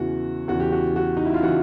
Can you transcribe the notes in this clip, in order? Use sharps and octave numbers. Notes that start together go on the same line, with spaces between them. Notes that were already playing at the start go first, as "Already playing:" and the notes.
Already playing: E2 C#3 E3 F#4
E2 C#3 E3 F#4
G4
F#4
F#4
D#4
E4
F4
C#3 E3 F#4